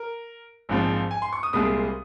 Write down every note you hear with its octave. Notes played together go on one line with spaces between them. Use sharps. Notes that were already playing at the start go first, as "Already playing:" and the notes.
Already playing: A#4
A#1 G#2 F3 C4
G#5
C6
C#6
D#6
C2 A#2 G#3 C4 D#6